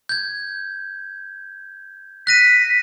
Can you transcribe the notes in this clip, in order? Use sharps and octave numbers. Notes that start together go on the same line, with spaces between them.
G6 G#6
F#6 A#6 B6 D#7